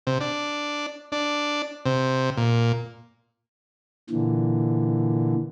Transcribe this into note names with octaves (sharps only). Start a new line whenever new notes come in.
C3
D4
D4
C3
A#2
A#2 D3 E3